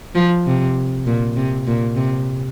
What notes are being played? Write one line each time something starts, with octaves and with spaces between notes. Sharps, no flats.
F3
C3
A#2
C3
A#2
C3